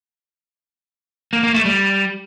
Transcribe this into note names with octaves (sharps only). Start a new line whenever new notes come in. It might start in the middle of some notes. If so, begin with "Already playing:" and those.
A#3
A#3
A3
G3